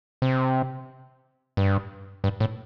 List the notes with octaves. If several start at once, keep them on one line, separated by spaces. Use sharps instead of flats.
C3
G2
G2
A2